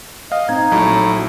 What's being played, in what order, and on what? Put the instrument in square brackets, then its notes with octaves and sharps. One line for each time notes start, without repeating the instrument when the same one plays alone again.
[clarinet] D#5 [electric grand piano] F5
[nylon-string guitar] C4 [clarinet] D#4 [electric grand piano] G#6
[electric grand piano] A#1 [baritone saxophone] A2 [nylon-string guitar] F#3 G3